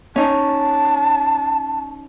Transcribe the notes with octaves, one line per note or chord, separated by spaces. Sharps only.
C#4 D#4 A5